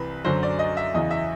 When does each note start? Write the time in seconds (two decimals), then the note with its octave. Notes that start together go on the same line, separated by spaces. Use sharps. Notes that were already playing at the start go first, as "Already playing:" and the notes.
Already playing: C2 C3 E3 B4
0.25 F#2 D3 F#3 C5
0.43 D5
0.59 D#5
0.77 E5
0.94 E2 C#3 E3 D#5
1.11 E5